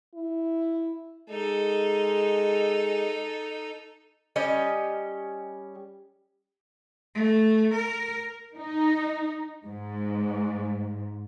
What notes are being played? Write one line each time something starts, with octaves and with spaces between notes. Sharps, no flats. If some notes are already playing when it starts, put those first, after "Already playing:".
E4
G#3 D#4 A4
G3 C#4 G4 D#5
A3
A#4
D#4
G#2